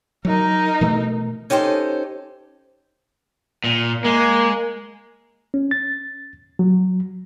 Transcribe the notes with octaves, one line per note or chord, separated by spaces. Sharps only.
F#3 D#4 A#4
B2 E3 A3
C#4 D#4 G4 A4 C5
A#2
G#3 A#3
C#4
A6
F#3